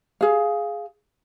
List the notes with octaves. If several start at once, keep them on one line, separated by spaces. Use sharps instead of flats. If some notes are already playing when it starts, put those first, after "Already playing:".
G#4 F5